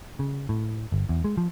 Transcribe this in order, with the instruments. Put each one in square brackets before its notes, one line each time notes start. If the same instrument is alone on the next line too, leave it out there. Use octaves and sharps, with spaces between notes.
[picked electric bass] C#3
A2
G1
E2
G#3
F3